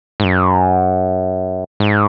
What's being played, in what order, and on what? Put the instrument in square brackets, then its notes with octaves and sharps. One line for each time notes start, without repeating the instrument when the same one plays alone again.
[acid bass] G#2
F#2
G#2